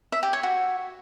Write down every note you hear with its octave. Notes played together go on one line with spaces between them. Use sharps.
E5
G4
C#5
F#4